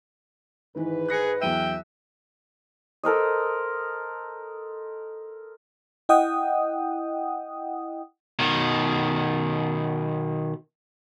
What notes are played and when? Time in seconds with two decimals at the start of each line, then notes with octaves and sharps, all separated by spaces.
0.75 G#2 D#3 E3 B4
1.08 G#4 F#6 A#6 C#7
1.42 E2 F#3 E5 G5 D#7
3.03 A4 A#4 C5 D#5
6.09 E4 D#5 F#5 G5 D#6
8.39 B2 D#3